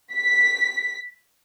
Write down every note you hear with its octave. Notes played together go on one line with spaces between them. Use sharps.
B6